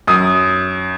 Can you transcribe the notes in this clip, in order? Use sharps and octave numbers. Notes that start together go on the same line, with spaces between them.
F#2 D#6